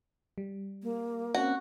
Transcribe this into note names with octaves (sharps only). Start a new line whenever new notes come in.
G3
A#3
C4 C#4 F#4